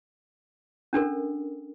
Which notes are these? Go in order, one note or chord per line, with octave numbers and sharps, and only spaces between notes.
C#4 D4 A4 A#4